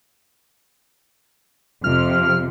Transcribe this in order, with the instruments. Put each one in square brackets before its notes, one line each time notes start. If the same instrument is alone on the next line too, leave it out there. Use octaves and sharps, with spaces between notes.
[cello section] F2 C3 [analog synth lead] F6